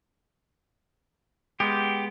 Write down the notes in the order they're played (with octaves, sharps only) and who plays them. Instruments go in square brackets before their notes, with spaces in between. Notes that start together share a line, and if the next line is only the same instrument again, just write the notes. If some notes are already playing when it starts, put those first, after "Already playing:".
[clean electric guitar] G#3 B3 [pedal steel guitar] G4